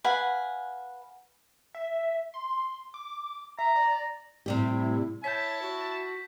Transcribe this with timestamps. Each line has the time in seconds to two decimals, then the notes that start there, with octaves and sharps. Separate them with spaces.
0.04 B4 F5 F#5 G#5
1.75 E5
2.34 C6
2.94 D6
3.59 E5 A#5
3.76 D5
4.46 A2 C3 G3 E4 G4
5.24 E4 C#5 A5 G6 B6
5.62 F#4